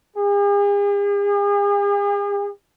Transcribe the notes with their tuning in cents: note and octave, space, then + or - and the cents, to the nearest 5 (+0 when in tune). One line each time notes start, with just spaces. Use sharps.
G#4 -45